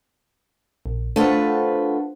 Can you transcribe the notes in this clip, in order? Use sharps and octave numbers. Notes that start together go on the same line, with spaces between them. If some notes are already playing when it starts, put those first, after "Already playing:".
A#1
A3 D4 F4 B4 C5 F#5